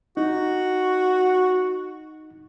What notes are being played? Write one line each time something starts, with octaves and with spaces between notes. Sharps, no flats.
D#4 F#4